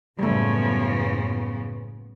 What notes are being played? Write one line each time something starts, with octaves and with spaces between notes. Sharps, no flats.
F#1 A2 C#3 F3 G3 A3 B3